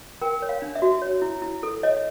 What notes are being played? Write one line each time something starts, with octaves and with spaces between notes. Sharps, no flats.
A#4 G5
C#5
F5
D4
E5
F#4
C#5
E4
E4
A4
C#5 D#5